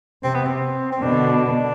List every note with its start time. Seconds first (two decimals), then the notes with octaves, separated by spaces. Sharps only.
0.24 C3 C4
0.34 B3
0.45 C4
0.92 C4
1.02 B2 D3 D4